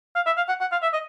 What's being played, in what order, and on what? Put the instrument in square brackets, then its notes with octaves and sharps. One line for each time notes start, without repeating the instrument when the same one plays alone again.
[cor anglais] F5
E5
F5
F#5
F#5
F5
E5
D#5